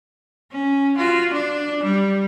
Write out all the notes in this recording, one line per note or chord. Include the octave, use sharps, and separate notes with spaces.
C#4
F4 F#4
D4
G3